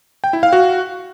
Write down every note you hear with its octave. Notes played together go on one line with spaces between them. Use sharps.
G5
E4
F5
F#4